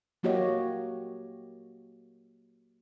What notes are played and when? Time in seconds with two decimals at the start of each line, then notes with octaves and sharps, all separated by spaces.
0.23 F#3 A#3 F#4 G4 C#5 D#5